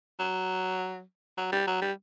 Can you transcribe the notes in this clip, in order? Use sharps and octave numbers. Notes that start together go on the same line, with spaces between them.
F#3
F#3
G3
F#3
G3